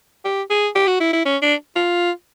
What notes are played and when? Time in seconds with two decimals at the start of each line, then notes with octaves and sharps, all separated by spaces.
0.25 G4
0.50 G#4
0.75 G4
0.87 F#4
1.00 E4
1.13 E4
1.25 C#4
1.42 D4
1.76 F4